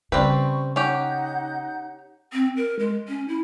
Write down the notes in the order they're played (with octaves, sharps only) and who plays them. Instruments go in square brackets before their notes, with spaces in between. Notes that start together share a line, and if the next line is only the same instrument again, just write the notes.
[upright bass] C#3 [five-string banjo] G3 C4 B4 [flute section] C#6
[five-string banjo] C#4 G4 [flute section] D#4 F#5 G6
[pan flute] C4
A#4
G#3
C#4
E4